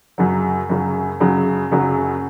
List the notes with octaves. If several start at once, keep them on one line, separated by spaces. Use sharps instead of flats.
F#2 C#3 F#3
F#2 C#3 F#3
F#2 C#3 F#3
F#2 C#3 F#3